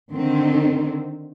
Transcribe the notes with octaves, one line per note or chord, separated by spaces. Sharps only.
D3 D#3 C4